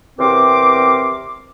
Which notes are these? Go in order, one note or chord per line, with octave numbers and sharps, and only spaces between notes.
E2 C3 C4 A#4 C6 D6